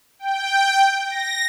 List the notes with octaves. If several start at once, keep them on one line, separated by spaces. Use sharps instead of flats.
G5
A#6